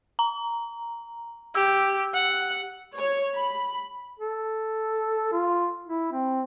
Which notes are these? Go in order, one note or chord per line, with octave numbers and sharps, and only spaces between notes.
A#5
G4 E6
F#5
C#5
B5
A4
F4
E4
C4